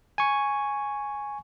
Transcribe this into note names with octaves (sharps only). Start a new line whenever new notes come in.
G#5 C#6